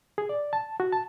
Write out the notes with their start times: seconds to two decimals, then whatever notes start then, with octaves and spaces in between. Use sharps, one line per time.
0.18 G#4
0.29 D5
0.53 A5
0.80 F#4
0.92 A5